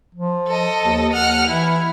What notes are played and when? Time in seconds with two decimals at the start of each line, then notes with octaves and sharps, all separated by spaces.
0.15 F3
0.47 A4 D#5
0.82 D#2
1.13 D#2 F#5 F6
1.47 E3 E4